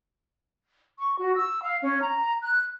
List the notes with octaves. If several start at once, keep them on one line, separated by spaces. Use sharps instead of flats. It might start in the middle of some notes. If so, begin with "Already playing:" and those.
C#6
F#4
E6
F5
C#4
A#5
F#6